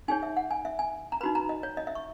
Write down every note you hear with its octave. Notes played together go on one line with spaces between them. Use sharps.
D#4 G#4 C#5 G#5
E5
F#5
G#5
E5
G#5
A#5
D#4 F#4 B4 B5
A#5
D#5
C#5
D#5
E5
C#6